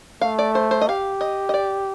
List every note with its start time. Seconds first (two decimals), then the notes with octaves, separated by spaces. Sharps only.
0.21 A3 F5
0.39 D5
0.55 C5
0.71 C5
0.81 D#5
0.88 G4 F5
1.21 D#5
1.49 D#5
1.54 D5